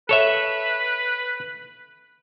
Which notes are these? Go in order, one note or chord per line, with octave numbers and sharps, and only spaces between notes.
A4 B4 C#5 E5